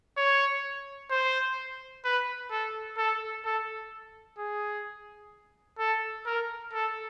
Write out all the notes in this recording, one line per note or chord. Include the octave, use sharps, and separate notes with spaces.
C#5
C5
B4
A4
A4
A4
G#4
A4
A#4
A4